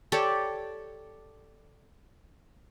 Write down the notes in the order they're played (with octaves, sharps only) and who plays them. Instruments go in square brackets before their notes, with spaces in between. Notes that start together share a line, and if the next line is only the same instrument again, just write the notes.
[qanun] G4 A4 C#5 D5